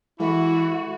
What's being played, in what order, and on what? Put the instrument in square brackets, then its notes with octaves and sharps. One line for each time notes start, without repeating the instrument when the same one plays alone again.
[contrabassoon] E3 [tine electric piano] G#3 A4 E5 [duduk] E4 [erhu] F#4